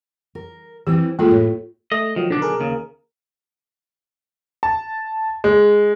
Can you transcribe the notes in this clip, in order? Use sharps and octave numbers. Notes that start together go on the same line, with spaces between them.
A#4
E3 C4 G4
G#3 A#3 F4 A4
A2
A3 D#5
D#3 F3 F#3
B1 D3 D#3 D4
G#4 A#4
D#2 C#3
A5
G#3